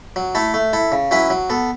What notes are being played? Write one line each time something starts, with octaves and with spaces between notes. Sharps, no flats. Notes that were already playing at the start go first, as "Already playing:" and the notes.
F#3
A3 E4 A4
A3
E4 A4
C#3
F#3 C#4 E4 B4
F#3
B3 A4